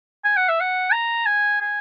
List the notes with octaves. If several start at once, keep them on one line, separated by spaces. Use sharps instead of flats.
G#5
F#5
E5
F#5
A#5
G#5
G#5